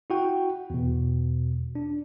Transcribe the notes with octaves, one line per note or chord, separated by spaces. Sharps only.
E4 F#4 G5
E2 B2
D4